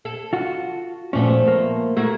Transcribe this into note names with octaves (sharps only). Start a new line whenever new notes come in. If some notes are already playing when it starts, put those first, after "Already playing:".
A4
F4 F#4
A#2 F3 A3 B3 C#4
A#3
A3 A#3 F#4